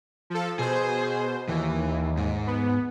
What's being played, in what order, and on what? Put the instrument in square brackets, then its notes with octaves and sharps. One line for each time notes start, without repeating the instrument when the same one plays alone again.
[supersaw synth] F3 A4
[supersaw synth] B2 C5 [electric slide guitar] G#4
[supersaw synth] D#2 [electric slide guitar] E3
[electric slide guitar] G#2
[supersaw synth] B3